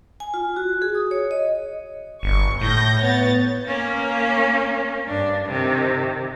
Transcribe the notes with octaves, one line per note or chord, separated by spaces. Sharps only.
G#5
F4
F#4
G#4
D#6
C#5
D#5
G1 C#6
A2 G6 A#6
B3 C#5 A6
A#3 C#4
G2 D4
C3 D#3